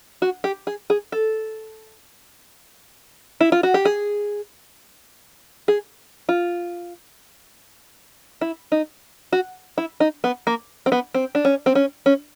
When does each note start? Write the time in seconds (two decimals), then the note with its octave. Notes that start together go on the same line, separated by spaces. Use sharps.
0.22 F#4
0.44 G4
0.67 G#4
0.90 G#4
1.12 A4
3.40 E4
3.52 F4
3.63 F#4
3.74 G4
3.85 G#4
5.68 G#4
6.29 F4
8.41 E4
8.72 D#4
9.33 F#4
9.78 E4
10.00 D#4
10.24 B3
10.47 A#3
10.86 C4
10.92 B3
11.14 C4
11.35 D4
11.45 C#4
11.66 C4
11.75 C#4
12.06 C#4